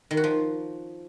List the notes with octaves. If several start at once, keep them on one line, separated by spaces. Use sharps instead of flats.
D#3
F#4
F3